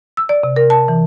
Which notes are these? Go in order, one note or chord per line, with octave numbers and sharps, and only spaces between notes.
E6
D5
C3
A#4
A5
E3